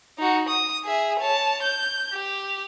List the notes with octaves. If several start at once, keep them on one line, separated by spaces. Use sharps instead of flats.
D#4 F#4
D#6
G#4 E5
C#5 A5
G6
G4